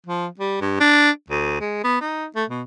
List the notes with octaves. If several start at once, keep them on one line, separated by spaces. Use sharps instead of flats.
F3
G3
G2
D4
D2
G#3
B3
D#4
A3
B2